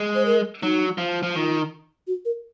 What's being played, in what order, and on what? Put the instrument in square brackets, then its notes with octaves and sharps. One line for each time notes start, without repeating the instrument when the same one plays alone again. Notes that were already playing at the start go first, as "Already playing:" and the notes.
Already playing: [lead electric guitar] G#3
[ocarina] C5
A#4
[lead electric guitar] F#3 [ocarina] D#4
[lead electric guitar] F3
F3
[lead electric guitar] D#3 [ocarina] F4
[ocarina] F#4
A#4